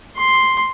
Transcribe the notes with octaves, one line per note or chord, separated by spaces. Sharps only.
C6